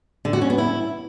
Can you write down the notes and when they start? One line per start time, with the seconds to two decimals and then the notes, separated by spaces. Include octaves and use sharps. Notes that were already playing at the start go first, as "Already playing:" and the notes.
0.25 D3
0.33 F#4
0.42 C#4
0.50 B3
0.58 E4